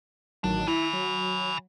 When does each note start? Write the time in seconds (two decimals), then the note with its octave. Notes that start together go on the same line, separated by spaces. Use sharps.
0.44 A1 D#3 F#3 D4
0.68 E4 G#5 B5
0.93 F#3